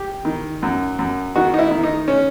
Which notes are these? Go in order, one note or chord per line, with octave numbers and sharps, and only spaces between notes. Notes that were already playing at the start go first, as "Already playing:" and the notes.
Already playing: G4
D#3
F#2
F#2
D#3 F#4
D#4
E4
D#3
D#4
C#4